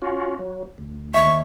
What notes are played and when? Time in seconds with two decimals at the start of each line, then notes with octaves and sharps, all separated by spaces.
0.02 C#4 F4 F#4
0.39 F#3
0.78 D2
1.14 D#2 E5 C#6